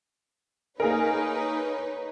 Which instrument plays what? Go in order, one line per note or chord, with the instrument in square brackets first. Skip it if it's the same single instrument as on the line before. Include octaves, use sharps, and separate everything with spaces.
[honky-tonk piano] A#3 G#4 A#4 [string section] D#4 B4 C#5